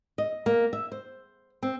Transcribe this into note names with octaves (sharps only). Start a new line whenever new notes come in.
D#5
A#3
E5
C5
C4